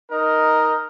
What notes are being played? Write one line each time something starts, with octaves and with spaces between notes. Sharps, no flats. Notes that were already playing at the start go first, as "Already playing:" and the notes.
D#4 A#4 D#5